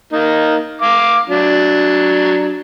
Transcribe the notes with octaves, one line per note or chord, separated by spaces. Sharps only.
A#3 D#4
F5 D6
F#3 D4